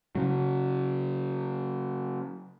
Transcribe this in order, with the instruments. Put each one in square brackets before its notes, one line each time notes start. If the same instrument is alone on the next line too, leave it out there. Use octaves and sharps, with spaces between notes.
[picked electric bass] C#3 F#3